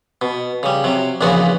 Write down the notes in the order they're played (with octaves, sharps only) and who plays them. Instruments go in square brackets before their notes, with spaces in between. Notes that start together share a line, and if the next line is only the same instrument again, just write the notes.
[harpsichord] B2
C#3 G3
C3 F#3
A#1 E2 A#2 C#3 B3 F#4